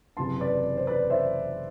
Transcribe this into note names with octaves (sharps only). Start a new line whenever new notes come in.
F#1 E2 C3 E3 A5 C6
B4 D5
B4
C5
B4 D5
C5 E5